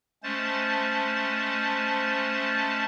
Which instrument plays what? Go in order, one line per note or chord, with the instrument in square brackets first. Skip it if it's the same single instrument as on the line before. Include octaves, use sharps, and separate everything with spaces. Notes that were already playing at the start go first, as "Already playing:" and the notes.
[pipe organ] G#3 A3 C#4 C5 A5 A6